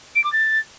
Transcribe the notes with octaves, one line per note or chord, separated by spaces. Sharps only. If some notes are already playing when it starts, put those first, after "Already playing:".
D7
D6
A6